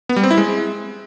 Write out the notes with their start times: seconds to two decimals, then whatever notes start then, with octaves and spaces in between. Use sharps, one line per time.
0.09 B3
0.16 G3
0.23 C4
0.31 E4
0.38 G#3